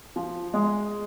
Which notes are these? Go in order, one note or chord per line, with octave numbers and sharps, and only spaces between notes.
F3
G#3